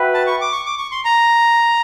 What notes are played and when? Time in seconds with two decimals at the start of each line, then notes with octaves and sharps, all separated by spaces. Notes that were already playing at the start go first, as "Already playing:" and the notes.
Already playing: F#4 B4 E5 G5
0.14 A5
0.27 C#6
0.41 D6
0.52 C#6
0.66 D6
0.78 C#6
0.92 C6
1.05 A#5